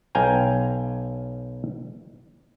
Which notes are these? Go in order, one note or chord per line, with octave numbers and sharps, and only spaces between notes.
B1 F5 G5 G#5 A#5